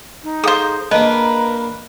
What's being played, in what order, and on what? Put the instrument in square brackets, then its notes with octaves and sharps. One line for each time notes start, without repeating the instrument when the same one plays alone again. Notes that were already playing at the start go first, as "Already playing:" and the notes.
[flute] D#4
[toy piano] G#4 A4 F5 [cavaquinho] C5 D#6
[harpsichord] A#3 D4 [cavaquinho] B4 [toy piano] D#5 [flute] A#5